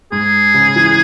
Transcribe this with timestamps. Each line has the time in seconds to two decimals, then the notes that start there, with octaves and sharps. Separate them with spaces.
0.12 G#2 G#4
0.54 C#3
0.76 E3